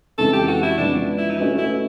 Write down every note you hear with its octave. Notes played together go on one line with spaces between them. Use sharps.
F2 C#3 E3 G#3 B3 A4
G4
F#4
E4
C#3 F3 G#3 B3 D4
E4
D#4
A3 C#4 E4 F#4 B4 D#5
E4